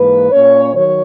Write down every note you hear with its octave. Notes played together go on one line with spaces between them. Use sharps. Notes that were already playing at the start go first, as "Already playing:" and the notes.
Already playing: G#2 E3 A#3 B4
A#2 A#3 C#4 C#5
D#3 F#3 C#5